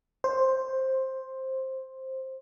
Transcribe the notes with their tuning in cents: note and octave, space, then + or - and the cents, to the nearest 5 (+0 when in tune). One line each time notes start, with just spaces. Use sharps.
C5 +10